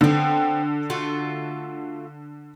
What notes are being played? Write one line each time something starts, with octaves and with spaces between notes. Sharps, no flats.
D3 B3 C4
A3 F4 F#4